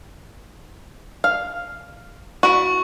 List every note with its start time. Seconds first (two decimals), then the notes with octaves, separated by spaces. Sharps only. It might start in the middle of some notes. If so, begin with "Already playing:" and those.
1.24 F5
2.43 E4 F#4 C#6